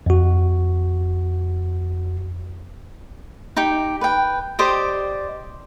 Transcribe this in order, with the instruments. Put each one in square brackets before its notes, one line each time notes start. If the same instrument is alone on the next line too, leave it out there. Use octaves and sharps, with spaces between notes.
[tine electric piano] F2 F#4
[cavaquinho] D#4 G4
B4 G5
G4 C5 D5 D#5